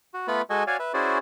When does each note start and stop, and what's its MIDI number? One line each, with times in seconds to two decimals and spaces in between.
0.14 0.27 66
0.28 0.42 57
0.28 0.42 59
0.28 0.42 65
0.28 0.42 71
0.28 0.42 83
0.50 0.64 56
0.50 0.64 66
0.50 0.64 69
0.50 0.64 75
0.50 0.64 80
0.67 0.77 66
0.67 0.77 73
0.67 0.77 74
0.67 0.77 77
0.67 0.77 80
0.79 0.92 71
0.79 0.92 76
0.94 1.18 61
0.94 1.18 64
0.94 1.18 66
0.94 1.18 68
0.94 1.18 72
0.94 1.18 74